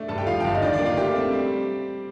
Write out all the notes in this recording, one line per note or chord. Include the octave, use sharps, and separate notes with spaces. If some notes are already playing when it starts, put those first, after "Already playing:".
Already playing: A3 D4
G2 A4 A5
G4 G5
F3 F4 F5
G5
G1 F5
D#5
D#3 D4 D5
D4 D5
A#3
F4 F5
A3 G4 G5
C4
G3